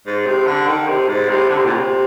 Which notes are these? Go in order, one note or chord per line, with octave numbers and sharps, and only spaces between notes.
G#2
C3
D3
D#3
C3
G#2
C3
D3
C3
A#2
C3